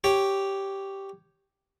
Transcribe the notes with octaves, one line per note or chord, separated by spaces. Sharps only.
G4 C#5